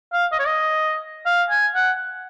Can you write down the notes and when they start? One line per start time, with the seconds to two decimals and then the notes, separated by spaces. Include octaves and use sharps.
0.13 F5
0.32 D#5
0.39 C#5
0.47 D#5
1.26 F5
1.50 G#5
1.75 F#5